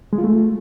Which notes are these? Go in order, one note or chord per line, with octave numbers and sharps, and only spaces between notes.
G#3
F4
A3